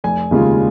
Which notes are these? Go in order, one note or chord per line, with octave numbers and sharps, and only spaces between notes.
F1 G#5
D#2 C#3 G#3 F4